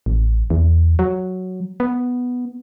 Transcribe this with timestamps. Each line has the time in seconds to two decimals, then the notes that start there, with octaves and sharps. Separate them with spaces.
0.06 A1
0.50 E2
0.99 F#3
1.80 B3